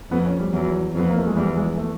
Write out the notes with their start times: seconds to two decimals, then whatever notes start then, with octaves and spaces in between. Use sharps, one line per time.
0.11 F2 B3
0.25 C#4
0.40 G3
0.53 E2 F#3
0.95 F2 B3
1.09 A#3
1.18 A3
1.27 G#3
1.36 E2 G3
1.57 G#3
1.78 A3